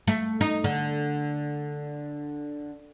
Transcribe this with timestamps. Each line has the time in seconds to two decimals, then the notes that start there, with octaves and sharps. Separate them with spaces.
0.07 A3
0.41 D#4
0.64 D3